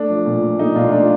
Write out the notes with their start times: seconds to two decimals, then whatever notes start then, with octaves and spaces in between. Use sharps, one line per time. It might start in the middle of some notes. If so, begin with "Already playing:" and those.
Already playing: A3 D4
0.09 F3
0.26 A#2
0.42 A#2
0.59 A3 D#4
0.76 A#2 D4 F4
0.92 A3 D4 F4